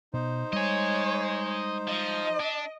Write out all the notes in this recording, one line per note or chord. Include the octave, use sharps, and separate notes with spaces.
B2 D#4 C5
G3 G#3 C#5 D#5 G#5
F3 D#5
D4